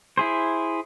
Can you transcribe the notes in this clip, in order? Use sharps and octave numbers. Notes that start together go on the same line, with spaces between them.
E4 G#4 C5